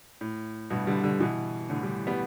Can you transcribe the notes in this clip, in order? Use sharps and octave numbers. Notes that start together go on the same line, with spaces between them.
A2
G2 B2
D3 G3
D3 G3
B2 E3
A2 D3
D3 G3
G3 B3